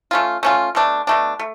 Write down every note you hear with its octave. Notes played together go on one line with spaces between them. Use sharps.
A3 C#4 F4
A3 C#4 F4
B2 A3 D4
B2 A3 D4
A3